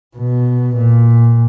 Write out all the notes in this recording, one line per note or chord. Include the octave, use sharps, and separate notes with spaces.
B2
A#2